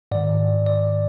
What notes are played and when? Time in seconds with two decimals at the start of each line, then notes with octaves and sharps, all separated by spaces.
0.11 G#2 D#3 D5
0.66 D5